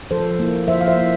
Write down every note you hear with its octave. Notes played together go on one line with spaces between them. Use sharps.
F3 A4 C5
A#3 E4
F3 C5 E5
F5
C5 E5
A#3 E4